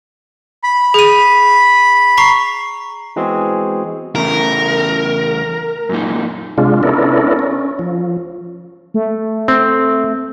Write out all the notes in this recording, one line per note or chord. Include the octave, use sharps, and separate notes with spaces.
B5
G#4 D#7
A#5 C#6 C7
E3 G#3 B3 C4 F#4 G#4
E2 C#3 A3 A#4
F#2 A#2 D#4
C3 G#3 D4 F4
B3 C#4 D4 E4 A4 A#4
C#4
F3
A3
C4